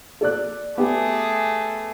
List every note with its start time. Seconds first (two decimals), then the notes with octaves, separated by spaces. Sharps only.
0.21 A4 D5 F#6
0.78 A3 B3 G4 G#4